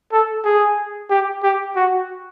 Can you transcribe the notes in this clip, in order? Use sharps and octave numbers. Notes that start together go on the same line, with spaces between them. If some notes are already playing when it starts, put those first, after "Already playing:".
A4
G#4
G4
G4
F#4